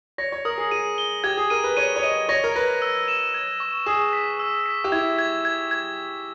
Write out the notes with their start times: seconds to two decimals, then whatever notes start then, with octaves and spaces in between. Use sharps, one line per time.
0.18 C#5 A#6
0.32 C#5
0.45 A#4 D#6
0.58 G#4
0.71 G#4 D#7
0.98 G7
1.24 G4 G#6
1.37 G#4
1.50 A#4 D#7
1.64 B4
1.77 C#5 D#7
1.96 C#5
2.03 D#5 D#7
2.29 C#5 A#6
2.44 A#4
2.56 B4 A#6
2.82 E6
3.08 E7
3.34 G#6
3.60 C#6
3.86 G#4 C#6
4.13 B6
4.39 E6
4.66 B6
4.84 G4
4.92 E4 G#6
5.19 G#6
5.45 G#6
5.71 G#6